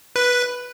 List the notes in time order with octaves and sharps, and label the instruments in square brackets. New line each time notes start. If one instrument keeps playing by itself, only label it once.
[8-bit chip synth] B4